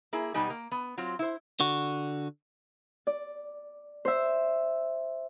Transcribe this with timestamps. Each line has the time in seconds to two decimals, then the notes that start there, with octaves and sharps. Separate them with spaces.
0.13 A#3 E4 G#4
0.34 B2 G3 B3 D#4 G4 G#5
0.50 A#3
0.72 B3
0.98 F#3 C4 F4
1.19 E4 C5
1.60 D3 F#4
3.07 D5
4.05 C5 E5